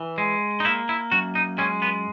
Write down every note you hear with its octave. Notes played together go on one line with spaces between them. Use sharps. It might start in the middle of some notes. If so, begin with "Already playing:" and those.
Already playing: E3
G#3
D#4
A#3 E4
E4
F#2 F#4
D#4
G#3 C#4
B3